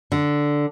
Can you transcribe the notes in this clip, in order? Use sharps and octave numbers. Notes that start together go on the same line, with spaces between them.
D3